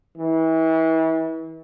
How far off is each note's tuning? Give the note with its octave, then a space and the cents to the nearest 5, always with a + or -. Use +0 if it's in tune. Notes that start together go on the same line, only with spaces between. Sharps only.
E3 -35